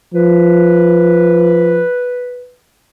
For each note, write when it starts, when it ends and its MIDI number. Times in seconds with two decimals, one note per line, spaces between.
0.14 1.84 53
0.14 2.53 71